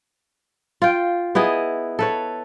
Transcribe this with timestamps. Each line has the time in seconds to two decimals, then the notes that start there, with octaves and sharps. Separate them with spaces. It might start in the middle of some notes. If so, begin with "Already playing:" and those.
0.82 F4 G5
1.35 B3 E4 G#4 D#5
1.99 A4 B4 C#5